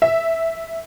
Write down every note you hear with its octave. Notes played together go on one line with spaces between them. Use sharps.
E5